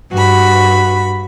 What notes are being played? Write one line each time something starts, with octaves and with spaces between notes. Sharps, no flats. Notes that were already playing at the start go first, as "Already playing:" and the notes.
G2 F#4 B5